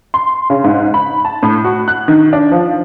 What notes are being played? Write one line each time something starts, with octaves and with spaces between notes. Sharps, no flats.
C6
C#3
G#2
B5
A5
A2
F#4
F#6
D#3
D4
F3